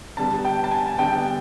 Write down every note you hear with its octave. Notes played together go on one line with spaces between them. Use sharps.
D3 G3 B3 A5
G5
A5
G#5
D3 G3 B3 G5